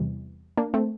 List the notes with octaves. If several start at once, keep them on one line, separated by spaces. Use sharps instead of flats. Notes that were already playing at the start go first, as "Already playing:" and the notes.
Already playing: E2 C3 E3 G3
A#3 D4
A3 C4